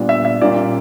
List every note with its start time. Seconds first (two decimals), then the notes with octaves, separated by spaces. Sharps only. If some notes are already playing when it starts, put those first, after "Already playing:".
Already playing: A#2 G3 B3 D4
0.09 E5
0.25 E5
0.42 A#2 G3 A#3 C#4 D5